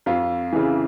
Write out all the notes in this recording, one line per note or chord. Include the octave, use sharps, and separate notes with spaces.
F2 F4
C#3 E3